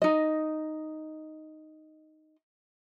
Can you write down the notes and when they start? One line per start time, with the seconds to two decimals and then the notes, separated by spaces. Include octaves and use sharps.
0.02 D#4 D#5